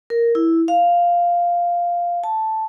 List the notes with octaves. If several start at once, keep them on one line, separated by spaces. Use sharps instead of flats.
A#4
E4
F5
A5